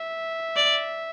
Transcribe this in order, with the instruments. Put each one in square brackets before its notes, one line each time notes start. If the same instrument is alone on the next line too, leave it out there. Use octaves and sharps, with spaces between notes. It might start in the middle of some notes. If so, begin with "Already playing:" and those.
Already playing: [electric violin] E5
[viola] D5